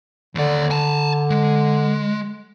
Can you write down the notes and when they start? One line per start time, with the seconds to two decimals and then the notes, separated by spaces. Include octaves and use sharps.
0.35 D#2 D3 D5
0.71 G#5 A5
1.30 G#3